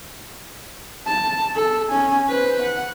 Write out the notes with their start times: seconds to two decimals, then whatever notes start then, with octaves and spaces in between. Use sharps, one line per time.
1.06 A5
1.55 A4
1.90 C#4 G#5
2.29 B4 C5
2.62 F#5